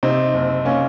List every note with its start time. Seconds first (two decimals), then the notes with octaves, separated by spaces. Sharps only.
0.03 C3 C4 D#4
0.34 F#1
0.65 A#3 C#4